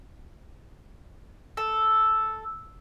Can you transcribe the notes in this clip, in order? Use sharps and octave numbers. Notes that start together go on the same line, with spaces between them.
A4